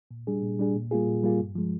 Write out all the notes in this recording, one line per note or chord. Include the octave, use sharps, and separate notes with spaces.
A#2
G3 D4 G#4
A#2
G3 D4 G#4
A#2
G3 A#3 F4 G#4
A#2
G3 A#3 F4 G#4
G2
F3 G#3